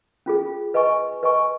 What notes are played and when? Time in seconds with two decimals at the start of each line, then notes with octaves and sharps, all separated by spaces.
0.26 C#4 F4 G#4
0.74 B4 D#5 G#5 C#6
1.23 B4 D#5 G#5 C#6